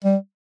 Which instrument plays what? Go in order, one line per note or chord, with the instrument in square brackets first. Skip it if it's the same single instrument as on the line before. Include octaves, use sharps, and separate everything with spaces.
[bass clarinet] G3